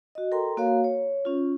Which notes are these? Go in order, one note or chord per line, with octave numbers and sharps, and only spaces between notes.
F#4 D#5
A4 A#4 G5 A#5 C6
A#3 F#4 A#4 C#5 F5
C#5
C#4 F4